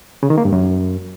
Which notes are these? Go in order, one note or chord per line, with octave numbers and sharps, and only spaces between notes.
C#3
D#3
A#3
G2
F#2